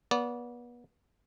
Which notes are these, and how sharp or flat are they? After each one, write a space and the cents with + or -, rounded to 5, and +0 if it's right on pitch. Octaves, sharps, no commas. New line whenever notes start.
B3 -30 D5 -25